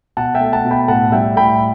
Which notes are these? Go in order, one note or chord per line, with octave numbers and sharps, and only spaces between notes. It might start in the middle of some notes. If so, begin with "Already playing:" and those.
B2 F#5 A5
E5 G5
A3
F#5 A5
B2
G5 B5
A2 F#5 A5
G3 E5 G5
A2 G5 B5